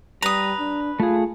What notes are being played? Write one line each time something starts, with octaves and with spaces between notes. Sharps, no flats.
G3 B4 A#5 D#6
D4
A3 F4 G#4